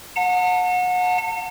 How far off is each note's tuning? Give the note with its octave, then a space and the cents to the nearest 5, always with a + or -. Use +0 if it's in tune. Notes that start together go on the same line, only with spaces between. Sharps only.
F#5 -30 A5 +40